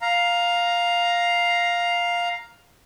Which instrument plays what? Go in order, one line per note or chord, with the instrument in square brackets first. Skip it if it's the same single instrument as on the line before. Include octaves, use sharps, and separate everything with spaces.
[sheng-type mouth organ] F5 A#5